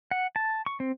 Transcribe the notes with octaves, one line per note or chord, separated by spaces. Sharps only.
F#5
A5
C#6
C4